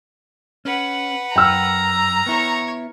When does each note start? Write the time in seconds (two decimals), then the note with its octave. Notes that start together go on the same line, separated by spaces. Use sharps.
0.65 C#4 B4 F#5
1.36 F#2 G5 A#5 E6 F6
2.26 B3 E4 C#5 C#6